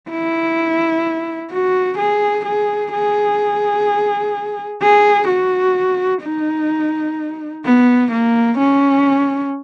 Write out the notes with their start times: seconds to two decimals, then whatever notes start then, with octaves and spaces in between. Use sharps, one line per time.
0.10 E4
1.52 F#4
1.99 G#4
2.46 G#4
2.93 G#4
4.82 G#4
5.29 F#4
6.23 D#4
7.65 B3
8.12 A#3
8.59 C#4